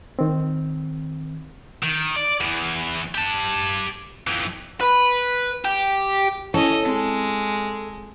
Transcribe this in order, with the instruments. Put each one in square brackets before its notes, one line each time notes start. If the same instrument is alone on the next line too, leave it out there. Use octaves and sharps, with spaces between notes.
[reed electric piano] D#3 C4
[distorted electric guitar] D#3
D5
E2 E3
G4 A5
F2 E3
[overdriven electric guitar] B4
G4
[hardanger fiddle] C#4 D#5 [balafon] E4 [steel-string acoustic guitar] A4
[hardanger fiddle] G#3 [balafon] C4